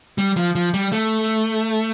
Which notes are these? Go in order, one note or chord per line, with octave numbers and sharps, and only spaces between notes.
G3
F3
F3
G3
A3